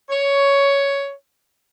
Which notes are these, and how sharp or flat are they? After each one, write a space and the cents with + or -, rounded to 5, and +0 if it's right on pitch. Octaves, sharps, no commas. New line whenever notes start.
C#5 +10